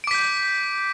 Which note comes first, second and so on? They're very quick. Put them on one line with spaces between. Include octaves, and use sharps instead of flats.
D7 D6 B6 G6